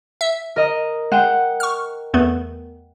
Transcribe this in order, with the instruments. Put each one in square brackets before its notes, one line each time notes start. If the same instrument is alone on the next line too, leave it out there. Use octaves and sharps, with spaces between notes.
[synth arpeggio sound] E5
[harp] A#4 D#5
[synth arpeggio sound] G#3 [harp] F#5 G5
[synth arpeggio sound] C#6 F6
E2 A3 B3